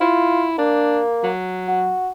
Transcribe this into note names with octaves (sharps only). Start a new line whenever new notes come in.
E4 F4
A#3 D4
F#3
F#4